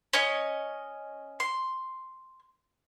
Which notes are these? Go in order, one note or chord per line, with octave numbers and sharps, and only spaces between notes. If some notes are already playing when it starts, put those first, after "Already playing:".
C#4 C#5 D#5
C6